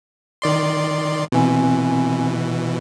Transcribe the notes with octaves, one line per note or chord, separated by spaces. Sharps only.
D#3 D5 C6
B2 E3 C4 G#5